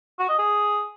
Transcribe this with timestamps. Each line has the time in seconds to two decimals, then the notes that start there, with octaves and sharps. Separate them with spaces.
0.19 F#4
0.29 D#5
0.39 G#4